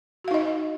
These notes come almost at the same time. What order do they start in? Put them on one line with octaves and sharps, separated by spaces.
F#4 F5 D#4 D#5